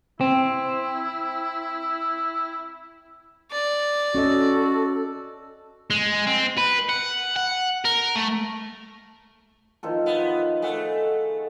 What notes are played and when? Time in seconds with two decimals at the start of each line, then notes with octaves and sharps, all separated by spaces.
0.21 C4 E4
3.52 D5
4.15 C#4 F#4 A4 D#5
5.90 G#3
6.27 C4
6.58 B4
6.89 F#5
7.36 F#5
7.85 A#4
8.15 A3
9.83 D#3 F3 A4
10.06 B3
10.62 A3 G#4 F#5